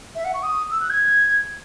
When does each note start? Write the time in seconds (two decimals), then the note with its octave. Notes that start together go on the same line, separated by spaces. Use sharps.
0.15 E5
0.24 F#5
0.34 C#6
0.43 D#6
0.71 E6
0.80 F#6
0.90 G#6